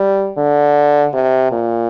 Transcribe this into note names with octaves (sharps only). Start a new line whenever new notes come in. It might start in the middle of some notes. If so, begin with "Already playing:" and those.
Already playing: G3
D3
C3
A#2